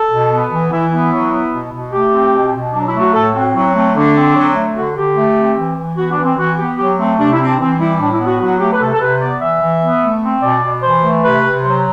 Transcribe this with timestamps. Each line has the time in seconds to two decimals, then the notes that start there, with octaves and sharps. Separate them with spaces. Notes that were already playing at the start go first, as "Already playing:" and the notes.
Already playing: A4
0.11 B2
0.31 B3
0.51 E3
0.72 E3 E4
0.92 B3 E4
1.11 F#3
1.32 B3
1.52 B2
1.72 B2
1.93 A3 G4
2.12 C4
2.33 B2
2.54 B2
2.73 F#3 D4
2.87 E4
2.94 A3
3.00 F#4
3.13 A2 A4
3.34 C4 F#4
3.54 F#3 E4
3.75 A3 C4
3.95 D3 D4
4.16 C4
4.36 F#3
4.55 A3
4.75 D3 F#4
4.96 D3 G4
5.16 A3
5.37 C4
5.57 E3
5.77 E3
5.97 B3 F#4
6.11 D4
6.18 E3
6.24 C4
6.37 E3 F#4
6.58 B3 G4
6.78 F#3 G4
6.98 A3 C4
7.19 C3 D4
7.33 E4
7.39 C4
7.46 D4
7.59 E3 C4
7.79 G3 E4
8.00 A2 D4
8.13 E4
8.20 B3
8.27 F#4
8.41 F#3 F#4
8.60 A3 G4
8.72 B4
8.81 C3 A4
8.93 A4
9.00 C3 B4
9.21 B3 D5
9.41 E3 E5
9.62 E3
9.82 B3
10.03 A3
10.23 C4
10.42 B2 D5
10.63 B2
10.83 E3 C5
11.04 A3
11.23 C3 B4
11.44 C3
11.64 F#3 C5